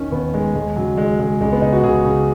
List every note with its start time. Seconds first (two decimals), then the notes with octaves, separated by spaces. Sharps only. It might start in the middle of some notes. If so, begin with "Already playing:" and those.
Already playing: D#2 D#3 C#4
0.12 D#2 B3
0.34 D#3 G#3
0.55 D#2 G#3
0.76 C#3 F#3
0.97 D#2 G#3
1.19 C#3 G#3
1.40 C#2 G#3
1.52 B3
1.62 C#3 D#4
1.73 F#4
1.83 C#2 G#4
2.05 C#3